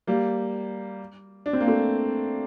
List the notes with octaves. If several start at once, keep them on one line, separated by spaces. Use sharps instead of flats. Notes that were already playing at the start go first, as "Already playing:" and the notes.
G3 A#3
D4
C4
A#3
A3 C4